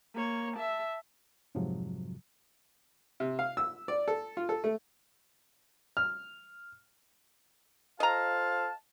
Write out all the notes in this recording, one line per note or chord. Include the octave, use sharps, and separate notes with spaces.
A#3 C#5
E5 A5
F2 G#2 C3 F3 F#3
C3
F5
E6
D5
A4
F4
A4
A3
F6
F4 A4 C5 D#5 F5 A5 A#5